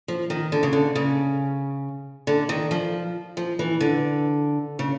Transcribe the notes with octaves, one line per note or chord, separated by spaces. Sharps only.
F3
D#3
D3
C#3
D3
C#3
D3
D#3
F3
F3
E3
D3
C#3